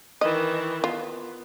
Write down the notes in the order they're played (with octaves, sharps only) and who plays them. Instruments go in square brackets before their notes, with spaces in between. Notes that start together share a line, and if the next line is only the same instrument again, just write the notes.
[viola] D#3 E3 [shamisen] D#5
[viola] B3 [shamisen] F4